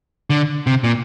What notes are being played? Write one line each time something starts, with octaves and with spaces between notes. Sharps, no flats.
D3
C3
A#2